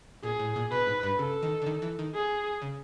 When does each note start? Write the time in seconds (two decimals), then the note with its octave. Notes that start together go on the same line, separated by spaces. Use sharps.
0.23 A#2 G#4
0.40 A2
0.56 A#2
0.72 B2 B4
0.87 G#2
1.03 G2
1.19 C#3 A4
1.43 D#3
1.62 D3
1.66 D#3
1.82 E3
1.99 D#3
2.15 G#4
2.62 C#3